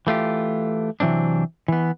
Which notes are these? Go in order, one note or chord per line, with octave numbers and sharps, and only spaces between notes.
E3 A3 F4 G4
C3 E3 F#3 C4 D4
E3 B3